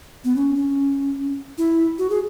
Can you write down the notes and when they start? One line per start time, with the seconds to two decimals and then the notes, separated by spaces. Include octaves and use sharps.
0.24 B3
0.36 C#4
0.56 C#4
1.58 E4
1.99 F#4
2.10 G#4